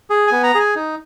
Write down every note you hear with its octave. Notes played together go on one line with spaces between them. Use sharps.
G#4
B3 G#5
A#5
G#4
G#5
D#4